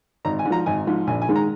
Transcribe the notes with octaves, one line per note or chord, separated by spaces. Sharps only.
G#1 A#5
G#5
G#2
F3 A#5
G#1 G#5
G#2 F3
A#1 G#5
G#5
G#2 D#3 G#3
A#5